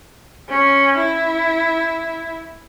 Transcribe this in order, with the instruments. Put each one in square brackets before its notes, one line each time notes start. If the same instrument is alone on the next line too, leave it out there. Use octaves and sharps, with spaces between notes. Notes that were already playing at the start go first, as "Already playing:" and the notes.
[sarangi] C#4
E4